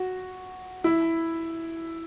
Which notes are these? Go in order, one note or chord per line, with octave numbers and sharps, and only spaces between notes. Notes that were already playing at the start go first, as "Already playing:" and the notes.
Already playing: F#4
E4